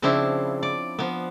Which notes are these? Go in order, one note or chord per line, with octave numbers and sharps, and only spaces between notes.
C#3 F3 C4 D4 E4
D5
F3 B3